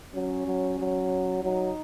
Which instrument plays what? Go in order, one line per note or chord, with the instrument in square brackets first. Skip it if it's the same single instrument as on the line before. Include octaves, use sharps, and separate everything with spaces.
[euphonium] F#3 [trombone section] C#4
[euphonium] F#3
F#3
[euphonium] F#3 [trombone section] D#4